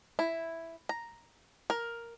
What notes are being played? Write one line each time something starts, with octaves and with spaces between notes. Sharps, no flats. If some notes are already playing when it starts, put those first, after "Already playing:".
E4
A#5
A#4